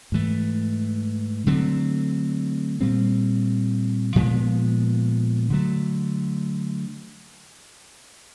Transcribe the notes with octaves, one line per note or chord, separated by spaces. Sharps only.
G#2 E3 A3
D3 F#3 A3 C4
A#2 G3 C4
A#2 F3 G#3 B3
D3 F#3 A3